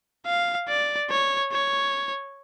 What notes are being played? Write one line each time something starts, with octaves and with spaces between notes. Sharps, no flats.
F5
D5
C#5
C#5